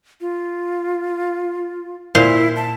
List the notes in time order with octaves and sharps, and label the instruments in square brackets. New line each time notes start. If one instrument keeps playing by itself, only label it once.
[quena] F4
[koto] A#2 C5 F5 [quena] E4
[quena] A5